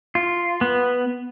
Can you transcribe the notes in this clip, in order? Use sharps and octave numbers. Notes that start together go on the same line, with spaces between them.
F4
B3